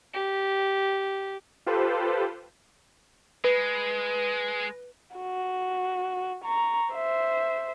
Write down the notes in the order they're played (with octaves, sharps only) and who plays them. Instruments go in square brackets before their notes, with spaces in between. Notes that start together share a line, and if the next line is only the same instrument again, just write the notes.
[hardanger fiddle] G4
[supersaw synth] F4 G4 A4 B4 C5
[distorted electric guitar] G#3 [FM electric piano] B4
[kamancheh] F#4
A#5 C#6
C5 E5